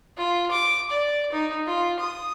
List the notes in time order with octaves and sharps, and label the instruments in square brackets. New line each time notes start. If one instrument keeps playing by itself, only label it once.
[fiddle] F4
D6
D5
D#4
F4
D#6